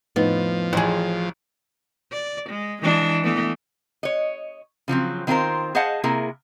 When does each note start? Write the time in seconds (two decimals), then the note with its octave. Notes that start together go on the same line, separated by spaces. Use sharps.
0.16 F2 A2 F3 B3 D#4
0.73 A1 G#4 C5
2.12 D5
2.50 G#3
2.82 E3 G#3 D4
3.23 E3 A3 B3
4.03 C#5 D#5
4.88 C#3 F3 F#3 C4
5.27 D#3 C4 F4 G#4 A#4 C5
5.75 G#4 C5 D#5 F5 F#5 A5
6.04 C3 A#3 E4 G#4 A#4